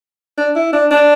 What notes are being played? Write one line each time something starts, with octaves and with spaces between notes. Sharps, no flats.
D4
E4
D4
D4